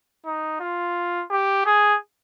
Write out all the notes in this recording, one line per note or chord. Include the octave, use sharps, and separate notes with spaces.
D#4
F4
G4
G#4